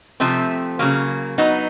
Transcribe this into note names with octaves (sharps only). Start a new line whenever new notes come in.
C3 F3 A3 C4
C#3 F#3 A#3
F#3 B3 D#4